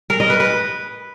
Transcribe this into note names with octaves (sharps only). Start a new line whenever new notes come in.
A#4
D#5
B4
B4